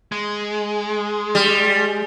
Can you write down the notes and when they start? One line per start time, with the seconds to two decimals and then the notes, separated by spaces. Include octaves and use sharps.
0.12 G#3
1.35 G3